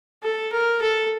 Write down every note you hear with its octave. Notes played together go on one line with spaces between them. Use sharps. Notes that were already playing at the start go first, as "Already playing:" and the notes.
A4
A#4
A4